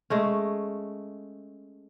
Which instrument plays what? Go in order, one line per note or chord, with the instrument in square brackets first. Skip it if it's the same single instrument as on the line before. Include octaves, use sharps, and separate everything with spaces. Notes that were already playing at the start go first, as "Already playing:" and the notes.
[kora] G#3 A3 C#4